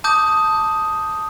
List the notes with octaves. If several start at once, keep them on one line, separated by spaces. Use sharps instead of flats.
A5 D6 D#6 G6